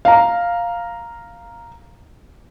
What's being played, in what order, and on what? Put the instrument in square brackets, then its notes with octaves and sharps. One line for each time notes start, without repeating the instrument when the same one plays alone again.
[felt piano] F5 A#5